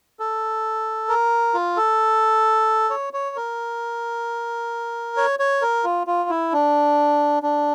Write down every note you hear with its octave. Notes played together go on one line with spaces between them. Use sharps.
A4
A#4
F4
A4
C#5
C#5
A#4
C#5
C#5
A#4
F4
F4
E4
D4
D4